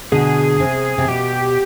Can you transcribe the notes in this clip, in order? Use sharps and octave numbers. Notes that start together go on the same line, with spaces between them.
B2 D3 G#4
C3
C3
B2 G4